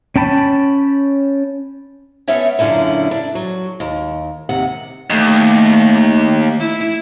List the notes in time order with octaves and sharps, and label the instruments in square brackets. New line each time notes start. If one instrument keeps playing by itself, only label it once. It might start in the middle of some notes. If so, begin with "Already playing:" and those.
[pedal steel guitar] C#4 G5 A5 B5
[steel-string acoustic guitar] B3 C#4 A4 C#5 E5 G5
F#2 A#2 D3 C#4 D4 E4
D4
F#3
D#2
D#2 C3 F#5
[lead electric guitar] D#2 [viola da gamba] A3
[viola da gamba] E4